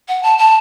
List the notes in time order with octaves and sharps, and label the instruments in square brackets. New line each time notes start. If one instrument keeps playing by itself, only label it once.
[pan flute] F#5
A5
A5